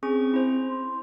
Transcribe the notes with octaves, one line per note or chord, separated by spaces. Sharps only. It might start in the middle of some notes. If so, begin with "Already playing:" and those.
C4 C#4 G#4 C#6
E4 C5
C6